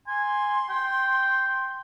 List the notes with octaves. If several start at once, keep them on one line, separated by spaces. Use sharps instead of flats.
G#5 C6
G5